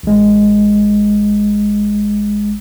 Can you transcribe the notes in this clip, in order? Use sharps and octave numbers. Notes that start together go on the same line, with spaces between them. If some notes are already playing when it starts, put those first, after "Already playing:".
A1 G#3